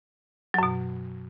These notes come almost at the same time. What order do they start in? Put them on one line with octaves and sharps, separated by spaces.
F#3 F#2 B2